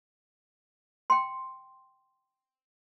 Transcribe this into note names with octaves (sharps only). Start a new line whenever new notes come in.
G5 C6